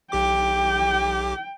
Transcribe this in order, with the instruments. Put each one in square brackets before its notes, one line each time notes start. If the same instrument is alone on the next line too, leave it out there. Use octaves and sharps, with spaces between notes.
[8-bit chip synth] B1 G4 D6 [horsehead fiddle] G5